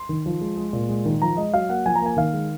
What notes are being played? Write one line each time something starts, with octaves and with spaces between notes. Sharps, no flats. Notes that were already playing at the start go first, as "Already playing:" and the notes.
Already playing: C6
D#3
F3
G#3
G#3
A#2
G#3
D#3
F3 A#5
G#3 D#5
F#3 F5
A#3 F#5
F3 G#5
A#5
A#3 G#5
D#3 F5
G#3